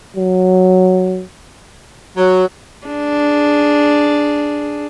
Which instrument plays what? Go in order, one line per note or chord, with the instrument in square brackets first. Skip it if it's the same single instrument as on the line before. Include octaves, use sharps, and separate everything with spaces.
[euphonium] F#3
[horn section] F#3
[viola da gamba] D4 G#4